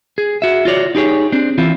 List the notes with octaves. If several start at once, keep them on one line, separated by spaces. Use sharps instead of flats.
G#4
F#4 E5
F4 F#4 C#5 D5
D#4 G4 G#4 C#5
C4 D4
E3 C4 E4 F4